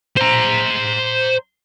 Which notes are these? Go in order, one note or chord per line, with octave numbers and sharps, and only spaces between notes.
C5 A#5